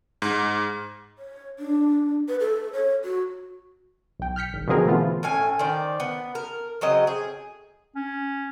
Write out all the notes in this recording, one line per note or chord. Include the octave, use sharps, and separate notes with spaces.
G#2
C#5
D4
B4
A4
C#5
F#4
B1 G5
F6 G6 B6 C#7
G#1
B2 D3 F3 C4 G#4 A#4
E3 A3 B3 F4
A2 C#4 G#5
D#3 C5 D5
B3
A#4
C#3 F#3 C4 D#5
G#4
C#4